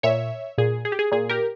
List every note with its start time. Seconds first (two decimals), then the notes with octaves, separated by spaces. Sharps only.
0.03 A#2 C#5 E5
0.58 A#2 G#4
0.85 G#4
0.92 G4
0.99 G#4
1.12 A#2 G#4
1.29 G4 A#4